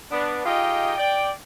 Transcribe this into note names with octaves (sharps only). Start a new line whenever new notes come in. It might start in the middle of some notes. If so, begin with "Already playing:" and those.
B3 D4
D#4 F4 G4 G#4 D#5 G5
D5 G5